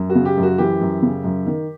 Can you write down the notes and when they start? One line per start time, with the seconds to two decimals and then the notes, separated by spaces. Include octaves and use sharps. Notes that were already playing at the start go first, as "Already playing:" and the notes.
Already playing: F#2
0.10 F#4
0.15 C#3
0.25 G4
0.37 F#2
0.43 F#4
0.58 E3 G4
0.81 F#2
1.02 C#3
1.24 F#2
1.46 D#3